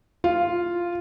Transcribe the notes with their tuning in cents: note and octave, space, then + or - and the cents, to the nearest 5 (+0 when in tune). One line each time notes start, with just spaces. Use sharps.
F4 -5